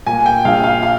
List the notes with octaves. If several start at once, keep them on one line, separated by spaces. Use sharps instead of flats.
A#2 G#5
G5
A#1 F5
F5
F5